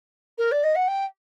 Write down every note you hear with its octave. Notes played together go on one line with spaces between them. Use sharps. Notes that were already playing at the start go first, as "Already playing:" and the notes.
A#4
D5
D#5
F#5
G5